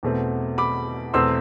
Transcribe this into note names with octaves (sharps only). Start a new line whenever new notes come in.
E2 B2 A3 C4
B5 D6
E2 B2 A3 C4 C6 E6